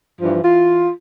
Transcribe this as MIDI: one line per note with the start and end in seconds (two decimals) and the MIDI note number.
0.21 0.39 43
0.21 0.39 52
0.21 0.39 53
0.42 0.89 52
0.42 0.89 65